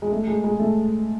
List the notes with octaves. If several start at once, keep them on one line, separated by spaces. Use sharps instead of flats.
G#3
A3
G#3
G#3
A3